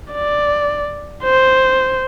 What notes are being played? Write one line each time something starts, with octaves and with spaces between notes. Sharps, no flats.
D5
C5